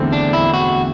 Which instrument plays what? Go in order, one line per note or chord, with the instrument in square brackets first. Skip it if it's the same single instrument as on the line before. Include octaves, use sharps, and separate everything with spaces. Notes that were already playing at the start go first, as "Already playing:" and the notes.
Already playing: [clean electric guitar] E2 D3 A3 C4
D4
E4
F#4